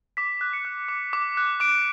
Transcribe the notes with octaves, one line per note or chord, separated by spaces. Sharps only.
D6 B6
F#6
C#7
F#6
D6
D6
F#6
D6 D7